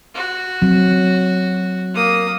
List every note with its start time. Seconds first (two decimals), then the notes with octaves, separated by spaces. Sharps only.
0.15 F#4
0.62 F#3 C4
1.94 A#3 D#6